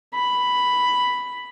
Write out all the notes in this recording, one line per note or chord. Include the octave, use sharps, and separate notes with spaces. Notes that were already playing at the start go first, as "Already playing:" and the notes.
B5